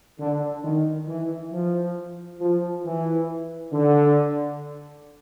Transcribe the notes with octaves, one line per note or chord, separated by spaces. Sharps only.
D3
D#3
E3
F3
F3
E3
D3